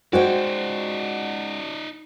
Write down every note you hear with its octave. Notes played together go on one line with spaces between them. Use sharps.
G#3 D#4 F#4 C5 D5 G5